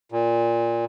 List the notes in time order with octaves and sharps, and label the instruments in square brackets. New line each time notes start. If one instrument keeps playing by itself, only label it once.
[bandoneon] A#2